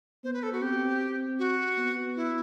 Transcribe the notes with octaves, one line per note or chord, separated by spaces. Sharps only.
B3 C5
B4
A4
F#4
C4 G4
F#4
B3
E4